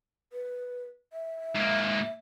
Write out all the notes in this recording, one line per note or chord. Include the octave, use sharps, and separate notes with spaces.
B4
E5
G#2 A#3